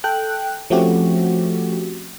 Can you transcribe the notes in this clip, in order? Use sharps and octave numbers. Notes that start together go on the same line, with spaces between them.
A4 G5 F#6
F3 A3 C4 C#4 F#4 G4